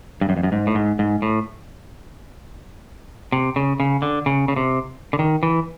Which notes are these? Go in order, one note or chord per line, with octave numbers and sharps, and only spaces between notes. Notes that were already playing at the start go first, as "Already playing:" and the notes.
G2
F#2
F2
F#2
G#2
A2
G#2
G#2
A2
C3
C#3
C#3
D3
C#3
C#3
C3
D3
D#3
E3